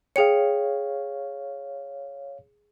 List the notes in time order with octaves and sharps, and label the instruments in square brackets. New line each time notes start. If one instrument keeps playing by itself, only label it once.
[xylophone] G#4 G5 C#7 [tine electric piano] C#5 F5